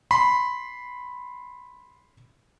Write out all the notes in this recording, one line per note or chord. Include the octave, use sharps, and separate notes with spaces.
B5 C6